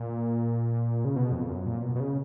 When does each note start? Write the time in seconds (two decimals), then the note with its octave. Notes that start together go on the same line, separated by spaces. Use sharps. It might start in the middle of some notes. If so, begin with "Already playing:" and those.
Already playing: A#2
1.05 C#3
1.16 B2
1.32 F2
1.49 F#2
1.66 A#2
1.82 B2
1.95 B2
2.00 C#3